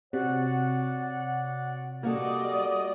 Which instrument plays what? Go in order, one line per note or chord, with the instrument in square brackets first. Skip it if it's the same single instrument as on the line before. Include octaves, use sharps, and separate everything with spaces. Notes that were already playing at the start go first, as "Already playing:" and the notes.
[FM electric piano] C3 [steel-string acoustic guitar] F#4 [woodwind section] C#5 D5 F#5
[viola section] G3 D5 D#5 [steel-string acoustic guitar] A#3 F#4 A4